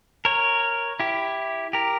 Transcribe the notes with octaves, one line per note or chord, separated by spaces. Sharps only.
A#4 C#5
E4 G4
G4 A#4